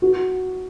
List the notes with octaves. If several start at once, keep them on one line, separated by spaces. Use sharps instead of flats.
F#4